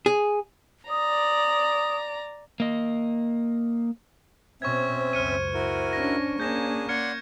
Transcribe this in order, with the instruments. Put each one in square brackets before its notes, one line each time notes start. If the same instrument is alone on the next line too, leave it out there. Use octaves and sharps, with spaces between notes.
[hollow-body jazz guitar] G#4
[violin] D5 A#5 [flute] D#6
[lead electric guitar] A#3 D#5
[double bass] B2 [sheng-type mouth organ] C4 C#4 E5 [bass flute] C5 [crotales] C#6 G#6
[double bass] C#2 F#2 [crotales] F6 C#7 D#7
[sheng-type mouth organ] E4 F#4 A#4
[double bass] C#4 D4 [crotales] A#6
[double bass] A#3 C#4 [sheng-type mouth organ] D4 G#4 [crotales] G6 A#6 E7
[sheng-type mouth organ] D5 F#5 C6 [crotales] F6 G#6 C#7